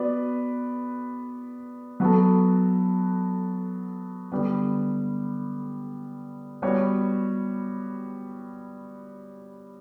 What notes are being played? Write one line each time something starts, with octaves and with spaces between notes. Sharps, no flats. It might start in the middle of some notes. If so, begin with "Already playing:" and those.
Already playing: B3 F#4 B4 D5
F#3 B3 F#4 A4
D3 G3 B3
G3 B3 F#4 C#5